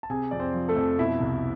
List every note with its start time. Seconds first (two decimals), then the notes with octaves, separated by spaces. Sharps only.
0.03 A5
0.10 C3 G#4 G#5
0.31 F2 D5
0.40 C4 C5
0.54 F3
0.69 A3 A4
0.76 F2
0.98 B2 E4 E5
1.21 C2